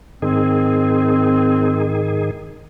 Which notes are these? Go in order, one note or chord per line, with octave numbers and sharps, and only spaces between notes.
G#2 D#3 C4 G#4